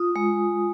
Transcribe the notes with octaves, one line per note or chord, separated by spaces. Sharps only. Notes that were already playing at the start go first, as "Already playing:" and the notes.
Already playing: F4 D#6
G#3